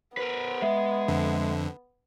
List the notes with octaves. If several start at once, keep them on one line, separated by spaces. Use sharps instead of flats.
B3 A#4 B4
G#3 E5
F2 D3